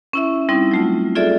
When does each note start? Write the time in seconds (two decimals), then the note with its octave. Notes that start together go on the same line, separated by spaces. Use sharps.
0.13 C#4 E4 E5
0.49 G3 C4 D#4 E4
0.71 F#3 A3 F4
1.16 F4 F#4 G#4 A4 D5 E5